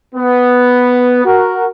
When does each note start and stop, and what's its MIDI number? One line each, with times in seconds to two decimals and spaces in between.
0.15 1.24 59
1.25 1.66 66
1.25 1.66 70